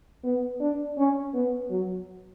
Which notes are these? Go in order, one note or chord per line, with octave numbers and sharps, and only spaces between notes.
B3
D4
C#4
B3
F#3